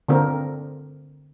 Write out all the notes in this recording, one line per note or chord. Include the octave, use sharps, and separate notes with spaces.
D3 A#3 C4 A#4